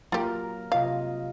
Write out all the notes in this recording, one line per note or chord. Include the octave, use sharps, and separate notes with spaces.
F#3 A#3 F4 G4 A#4
C3 F4 D#5 F5